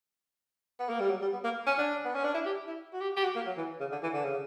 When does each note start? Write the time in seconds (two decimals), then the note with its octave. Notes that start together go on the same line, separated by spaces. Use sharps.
0.80 B3
0.90 A#3
1.00 G3
1.10 F#3
1.21 G3
1.33 B3
1.44 A#3
1.67 C#4
1.78 D4
2.05 B3
2.15 C#4
2.24 D4
2.34 E4
2.46 G4
2.67 E4
2.93 F#4
3.01 G4
3.16 G4
3.24 F#4
3.36 A#3
3.47 F#3
3.58 E3
3.80 C#3
3.92 D3
4.03 E3
4.14 D3
4.25 C#3